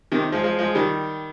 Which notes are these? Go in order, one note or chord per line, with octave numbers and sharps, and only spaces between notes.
C3 D#3
F3 G#3
F3 G#3
F3 G#3
D#3 G3